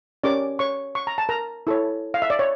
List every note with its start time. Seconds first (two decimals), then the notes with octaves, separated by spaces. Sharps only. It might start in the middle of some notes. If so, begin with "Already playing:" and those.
0.24 C#4 G4 A#4 C#5 D5 D6
0.59 C#5 C#6
0.95 C#6
1.07 A#5
1.18 A5
1.29 A#4 A#5
1.67 E4 A4 C#5
2.14 F5
2.22 E5
2.30 D5
2.39 C#5